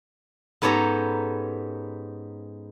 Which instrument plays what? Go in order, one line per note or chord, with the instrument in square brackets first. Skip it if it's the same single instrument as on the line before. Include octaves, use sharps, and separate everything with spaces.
[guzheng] G#2 B3 C#4 G4 A4 A#5